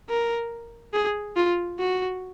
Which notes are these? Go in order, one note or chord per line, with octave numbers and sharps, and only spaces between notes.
A#4
G#4
F4
F#4